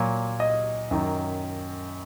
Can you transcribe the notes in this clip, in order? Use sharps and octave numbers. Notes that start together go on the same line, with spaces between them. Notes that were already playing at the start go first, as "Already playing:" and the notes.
Already playing: A#2 F#3
D#5
F#2 D#3 F#3